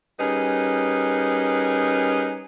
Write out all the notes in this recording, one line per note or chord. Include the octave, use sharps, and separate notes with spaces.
G3 C#4 D#4 G#4 A#4 B4